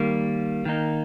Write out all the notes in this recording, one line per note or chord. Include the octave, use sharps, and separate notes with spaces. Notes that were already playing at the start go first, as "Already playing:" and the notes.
Already playing: D#3 G3 A#3
D#3 A#3 D#4